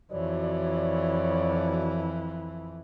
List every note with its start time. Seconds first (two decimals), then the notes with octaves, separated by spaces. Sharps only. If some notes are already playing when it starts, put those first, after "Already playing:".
0.13 F2 E3 F#4 C#5 D5